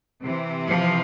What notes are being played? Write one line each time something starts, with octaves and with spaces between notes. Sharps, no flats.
C3 E3
F3